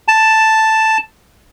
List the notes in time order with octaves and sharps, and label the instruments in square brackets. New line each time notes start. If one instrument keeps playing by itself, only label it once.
[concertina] A5